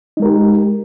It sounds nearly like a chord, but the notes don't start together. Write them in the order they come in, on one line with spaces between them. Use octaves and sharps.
D#4 G#3 A#4 G4